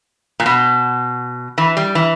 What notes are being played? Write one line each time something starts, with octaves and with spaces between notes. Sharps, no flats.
A#2
B2
E3
G3
E3